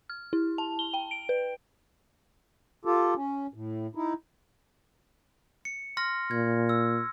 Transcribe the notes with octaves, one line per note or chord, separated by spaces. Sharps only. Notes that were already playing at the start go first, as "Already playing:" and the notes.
F6
E4
A5
G7
G5
D7
B4
F4 G4 A4
C#4
A2
D#4 E4
C#7
C6 F6 A#6
A#2 G#6
E6